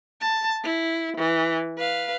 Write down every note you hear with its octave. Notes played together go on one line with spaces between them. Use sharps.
A5
E4
E3
B4 F5